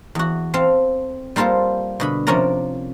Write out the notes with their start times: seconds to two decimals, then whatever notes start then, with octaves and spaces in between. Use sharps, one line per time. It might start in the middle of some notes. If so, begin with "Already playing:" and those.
0.15 E2 F#4
0.54 C4 A4 F5
1.36 G3 A#3 F4 A4 C5
2.00 B2 D3 B5
2.27 C3 F3 C#4 A#4 D5 A#5